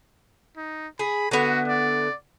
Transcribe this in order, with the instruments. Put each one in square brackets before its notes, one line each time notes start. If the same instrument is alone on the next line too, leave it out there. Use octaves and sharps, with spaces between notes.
[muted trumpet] D#4
[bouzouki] G#4 [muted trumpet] B5
[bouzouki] D3 B3 E5 [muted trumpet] F#4
[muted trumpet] D5